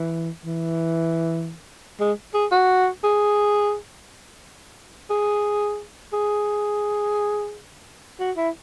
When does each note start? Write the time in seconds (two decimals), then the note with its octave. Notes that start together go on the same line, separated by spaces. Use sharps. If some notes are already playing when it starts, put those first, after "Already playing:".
Already playing: E3
0.45 E3
2.00 G#3
2.34 G#4
2.52 F#4
3.04 G#4
5.10 G#4
6.13 G#4
8.20 F#4
8.37 E4